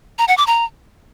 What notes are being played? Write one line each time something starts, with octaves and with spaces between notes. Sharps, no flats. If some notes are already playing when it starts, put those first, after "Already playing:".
A#5
F#5
D6
A#5